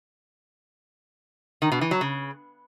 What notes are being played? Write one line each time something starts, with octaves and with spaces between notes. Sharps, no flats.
D#3
B2
E3
F#3
C#3